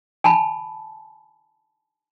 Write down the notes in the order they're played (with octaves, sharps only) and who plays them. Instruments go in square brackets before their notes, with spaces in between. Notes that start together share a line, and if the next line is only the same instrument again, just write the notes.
[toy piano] G#5 A5 B5